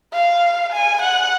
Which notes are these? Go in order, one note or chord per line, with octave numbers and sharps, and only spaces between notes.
F5
G#5
F#5